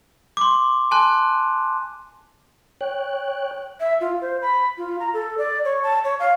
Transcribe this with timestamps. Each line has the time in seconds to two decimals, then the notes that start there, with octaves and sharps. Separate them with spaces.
0.37 C6 D6
0.91 G#5 A5 C6 F#6
2.81 C#5 G5 F#6
3.80 E5
4.01 F4
4.21 C5
4.42 B5
4.78 F4
5.00 A#5
5.14 A4
5.38 D5
5.65 C#5
5.83 A5
6.04 C#5
6.20 F5